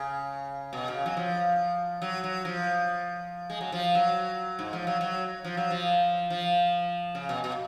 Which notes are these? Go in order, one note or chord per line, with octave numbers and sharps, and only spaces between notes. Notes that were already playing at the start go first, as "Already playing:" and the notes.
Already playing: C#3
B2
C#3
F#3
F3
F#3
F#3
F3
G#3
F#3
F3
F#3
G#2
F3
F#3
F#3
F3
F#3
F3
F3
C#3
B2
B2